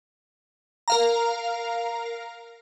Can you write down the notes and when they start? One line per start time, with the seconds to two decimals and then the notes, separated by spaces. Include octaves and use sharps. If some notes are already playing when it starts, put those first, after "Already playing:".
0.88 A#4 F5 A#5